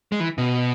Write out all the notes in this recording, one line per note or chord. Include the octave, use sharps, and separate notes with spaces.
G#3
E3
B2